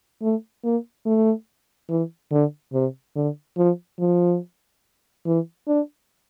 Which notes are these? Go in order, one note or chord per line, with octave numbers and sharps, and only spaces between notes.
A3
A#3
A3
E3
D3
C3
D3
F3
F3
E3
D4